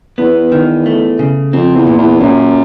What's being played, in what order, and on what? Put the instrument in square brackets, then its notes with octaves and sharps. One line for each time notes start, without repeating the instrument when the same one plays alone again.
[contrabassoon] E2 [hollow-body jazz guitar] B3
[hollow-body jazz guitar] D#3
A3
C#3
[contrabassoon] F2 [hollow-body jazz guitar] C4
[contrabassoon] E2
[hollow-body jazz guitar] A#2
[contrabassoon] E2
[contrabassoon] F#2 [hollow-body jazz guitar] A#2